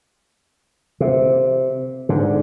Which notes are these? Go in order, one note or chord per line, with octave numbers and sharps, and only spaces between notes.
C3
G#2 D3